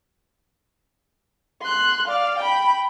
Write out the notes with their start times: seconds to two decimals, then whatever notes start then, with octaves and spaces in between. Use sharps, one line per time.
1.62 C6 F#6
2.07 D5 F5
2.38 G5 B5